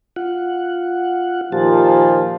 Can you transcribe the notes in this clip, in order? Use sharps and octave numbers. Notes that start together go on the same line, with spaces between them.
F4 F#5
A#2 D#3 F3 G4 A5